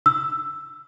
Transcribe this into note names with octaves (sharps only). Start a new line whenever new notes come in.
E6